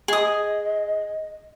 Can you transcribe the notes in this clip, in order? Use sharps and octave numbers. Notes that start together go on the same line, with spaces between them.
G#4 D#5 D#6